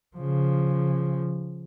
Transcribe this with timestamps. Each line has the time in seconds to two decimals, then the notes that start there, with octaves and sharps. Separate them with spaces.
0.17 C#3 F3